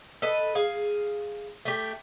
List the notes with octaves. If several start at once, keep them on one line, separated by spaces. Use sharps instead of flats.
A4 B4 D#5
G#4 F5
A3 G4